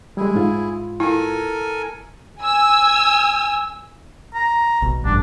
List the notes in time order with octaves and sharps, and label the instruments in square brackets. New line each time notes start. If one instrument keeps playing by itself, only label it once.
[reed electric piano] G3 G#3 [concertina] E4 G#4
[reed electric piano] G#2 F4
[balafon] E4 [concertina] A4 A#4 G#5
[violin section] G#5 E6
[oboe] A#5
[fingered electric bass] B1
[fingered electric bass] A1 G2 [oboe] D4